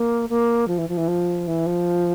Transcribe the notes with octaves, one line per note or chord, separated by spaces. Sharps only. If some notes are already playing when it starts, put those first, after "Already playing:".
Already playing: A#3
A#3
F3
E3
F3
E3
F3
E3
F3